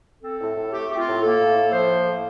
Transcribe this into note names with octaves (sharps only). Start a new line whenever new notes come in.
C4 A4
A2
A2
A3 G4
C4 G4
F4
A2
A#3 A4
A2
A2
F3 C5
A#3
A2